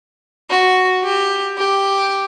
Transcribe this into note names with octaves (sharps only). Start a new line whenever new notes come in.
F#4
G4
G4